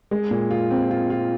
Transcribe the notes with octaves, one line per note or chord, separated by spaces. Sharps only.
G#3
A#2
F4
C4
F4
F4